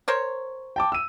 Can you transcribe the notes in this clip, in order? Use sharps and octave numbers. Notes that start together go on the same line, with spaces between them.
A#4 C5 C#5
G5 A5 D6
E6 D#7